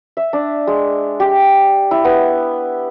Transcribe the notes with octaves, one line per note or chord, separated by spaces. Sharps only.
E5
D4
G#3
G4
E4
B3